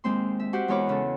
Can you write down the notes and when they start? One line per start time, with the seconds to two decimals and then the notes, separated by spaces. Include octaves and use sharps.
0.04 D#2 G#3 C4 C6
0.40 E5
0.53 F#4 G4 C5 F#5
0.68 E2 G#3 A#4 C#5 B5 D6
0.87 C#3 C#4 A4